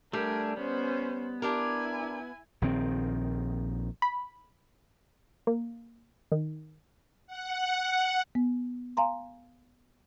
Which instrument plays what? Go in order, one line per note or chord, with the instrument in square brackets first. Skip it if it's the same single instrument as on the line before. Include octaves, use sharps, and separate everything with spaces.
[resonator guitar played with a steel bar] G3 [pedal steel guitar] A3 D4 G4 [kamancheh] A#4 G#5
[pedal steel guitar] B3 [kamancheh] C#4 C5
[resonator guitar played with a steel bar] D4 G4 A#4 [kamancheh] E4 G#5
[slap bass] A#1 D#3 C4
[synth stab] B5
A#3
D#3
[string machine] F#5
[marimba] B3
F5 G#5 A#5 C6